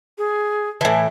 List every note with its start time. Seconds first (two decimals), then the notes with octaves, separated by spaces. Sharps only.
0.18 G#4
0.81 A2 E3 A5